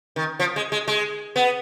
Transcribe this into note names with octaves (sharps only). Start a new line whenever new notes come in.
D#3
F3
G#3
G#3
G#3
B3